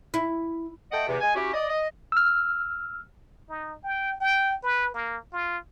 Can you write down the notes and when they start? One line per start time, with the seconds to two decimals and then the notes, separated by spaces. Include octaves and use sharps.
0.14 E4
0.92 A3 A4 D#5 F#5 G5
1.08 E2 C3
1.21 G#3 G#5
1.35 C#4 E4 F#4 G4
1.54 D5 D#5
1.69 D#5
2.12 E6 F6
3.49 D#4
3.84 G5
4.20 G5
4.63 B4
4.94 A#3
5.33 F4